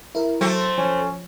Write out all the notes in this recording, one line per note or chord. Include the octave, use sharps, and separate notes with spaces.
E4 A#4
F#3 A3 C4
F3 C#4